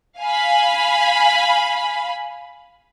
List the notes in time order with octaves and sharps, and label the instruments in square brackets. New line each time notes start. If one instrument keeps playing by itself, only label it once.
[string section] F5 G#5 B5